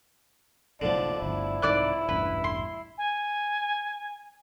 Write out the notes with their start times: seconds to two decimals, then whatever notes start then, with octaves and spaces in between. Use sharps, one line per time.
0.82 F#1 B1 A2 D3 F3 D5
1.22 G1 D2 E4
1.62 C2 G#2 D#3 D5 D6 F#6
2.09 E1 A1 G2 B4
2.44 C6
2.98 G#5